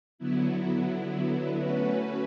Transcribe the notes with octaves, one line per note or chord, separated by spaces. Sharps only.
D3 F#3 B3 E4
A3 C#4 F#4 B4